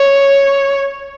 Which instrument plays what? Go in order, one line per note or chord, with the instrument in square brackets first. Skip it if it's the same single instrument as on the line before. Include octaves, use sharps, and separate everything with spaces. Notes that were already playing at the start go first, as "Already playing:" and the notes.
Already playing: [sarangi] C#5